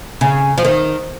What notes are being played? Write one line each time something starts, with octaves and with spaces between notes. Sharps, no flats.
C#3
F3
D#3